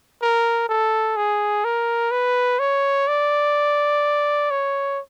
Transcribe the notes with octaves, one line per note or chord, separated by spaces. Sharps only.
A#4
A4
G#4
A#4
B4
C#5
D5
C#5